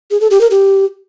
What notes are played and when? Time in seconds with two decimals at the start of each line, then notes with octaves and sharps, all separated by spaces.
0.11 G#4
0.21 A4
0.31 G4
0.41 A#4
0.51 G4